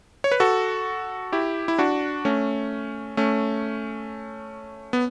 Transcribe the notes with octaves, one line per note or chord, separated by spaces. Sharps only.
C#5
B4
F#4 A4
E4 G4
E4
D4 F#4
A3 C#4
A3 C#4
B3